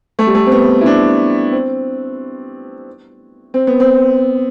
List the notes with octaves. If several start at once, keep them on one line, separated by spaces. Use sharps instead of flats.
A3
G3
A3
C4
B3
E4
D4
C4
C4
B3
C4